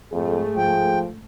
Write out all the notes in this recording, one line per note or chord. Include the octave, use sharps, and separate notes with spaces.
F2 G#2 A3 G#4
F3 G5